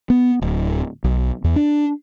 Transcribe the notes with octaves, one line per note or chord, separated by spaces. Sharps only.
B3
D1
B1
E2
D4